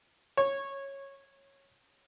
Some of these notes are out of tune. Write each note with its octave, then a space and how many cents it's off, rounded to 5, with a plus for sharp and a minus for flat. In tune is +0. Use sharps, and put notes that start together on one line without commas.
C#5 -15